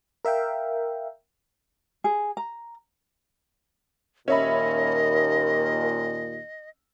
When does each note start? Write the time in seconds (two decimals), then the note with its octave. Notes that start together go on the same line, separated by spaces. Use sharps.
0.25 A#4 E5 F5 G5
2.04 G#4
2.37 A#5
4.28 D#2 A#2 C#4 A#4 D#5 E5 B5